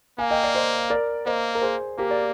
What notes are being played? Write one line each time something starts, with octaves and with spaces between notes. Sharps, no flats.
A#3 F5 G#5
D#5 G5
D5 F5
C5 D#5
A#4 D5
A#3 C5 D#5
A#4
G#4 C5
A#3 G4 A#4
A#4 D5